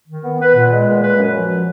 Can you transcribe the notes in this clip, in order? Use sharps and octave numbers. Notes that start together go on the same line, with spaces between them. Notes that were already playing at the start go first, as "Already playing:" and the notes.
D#3
B3
B3 B4
A#2
G#3
A#2
G#3 B4
F#2
F3